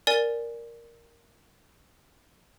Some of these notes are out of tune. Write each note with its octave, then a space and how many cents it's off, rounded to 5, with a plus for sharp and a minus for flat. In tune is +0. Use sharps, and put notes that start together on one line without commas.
A#4 +0 D5 +0 G#5 +0